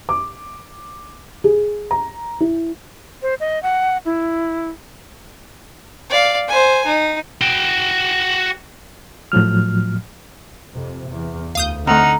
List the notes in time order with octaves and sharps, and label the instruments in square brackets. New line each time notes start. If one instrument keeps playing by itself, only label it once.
[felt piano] D6
G#4
A#5
E4
[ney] C5
D#5
F#5
E4
[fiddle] D5 F5
C5 G#5
D#4
[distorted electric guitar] F#4 G5
[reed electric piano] A2 F3 F#3 F6
[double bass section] F2 C3
E2
[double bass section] D2 [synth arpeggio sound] F5 D#6 G6
[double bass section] D3 [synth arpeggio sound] A3 C4 [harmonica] D#4 F#5 F6 [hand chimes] A#5